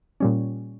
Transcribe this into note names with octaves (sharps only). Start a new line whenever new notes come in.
A#2 G3 C#4